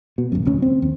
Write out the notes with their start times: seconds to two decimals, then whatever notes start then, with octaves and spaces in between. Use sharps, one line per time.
0.18 B2
0.32 D#1 A1 F#2
0.45 F1 D2 C#4
0.62 C4
0.82 D#2